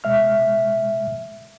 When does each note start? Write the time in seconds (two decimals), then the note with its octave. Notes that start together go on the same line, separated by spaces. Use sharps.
0.04 B2 G#3 E5 F6